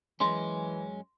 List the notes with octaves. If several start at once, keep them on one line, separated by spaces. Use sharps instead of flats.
F#2 E3 G#3 C#4 C6